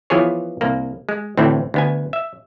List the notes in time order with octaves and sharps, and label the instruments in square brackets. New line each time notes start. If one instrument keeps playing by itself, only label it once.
[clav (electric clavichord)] E3 F3 B3 G#4 C#5
C2 A#3
G#3
D2 A2 E3 C4
D2 B3 G#5
E5